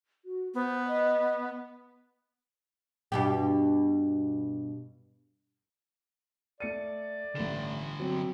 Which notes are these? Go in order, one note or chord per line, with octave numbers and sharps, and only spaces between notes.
F#4
B3 C5
D#5
G2 B2 G4
A3 D5 C#7 D#7
A1 D3 G3 A4 E7
F#3 C4